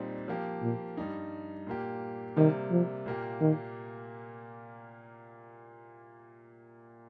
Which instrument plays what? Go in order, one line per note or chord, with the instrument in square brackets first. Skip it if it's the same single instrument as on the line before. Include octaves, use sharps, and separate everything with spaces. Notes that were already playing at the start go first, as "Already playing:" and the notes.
Already playing: [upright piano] A#2 G3 C4 D#4
F3 A#3 G4
[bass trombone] A#2
[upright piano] G2 G3 D#4
A#2 A#3 G4
[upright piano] C3 G3 A#3 [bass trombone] D#3
[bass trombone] F3
[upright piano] A#2 A#3 G4
[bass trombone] D#3